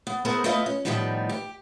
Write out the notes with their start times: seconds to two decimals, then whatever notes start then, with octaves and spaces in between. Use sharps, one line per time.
0.07 B3
0.25 A3 B3 E4 G#4 A#4 C5
0.44 A3 B3 E4 F4 B4 D#5
0.66 C#4
0.85 A2 D#3 F3 G3 B3 D#4
1.29 G4